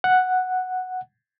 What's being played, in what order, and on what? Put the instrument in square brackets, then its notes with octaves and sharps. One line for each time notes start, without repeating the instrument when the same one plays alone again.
[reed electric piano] F#5